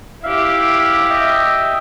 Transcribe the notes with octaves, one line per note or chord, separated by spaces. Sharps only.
E4 G4 E5 F5
D#5 E5 G5